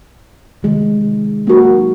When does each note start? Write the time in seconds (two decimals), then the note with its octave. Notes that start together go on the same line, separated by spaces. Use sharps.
0.63 C3 D#3 G#3
1.47 F#3 A#3 D#4 F#4 A#4